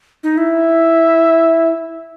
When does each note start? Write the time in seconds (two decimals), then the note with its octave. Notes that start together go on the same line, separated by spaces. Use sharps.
0.23 D#4
0.37 E4 E5